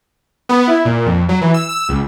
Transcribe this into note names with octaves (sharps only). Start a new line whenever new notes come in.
B3
E4
A#2
F2
F#3
E3
E6
E6
C#2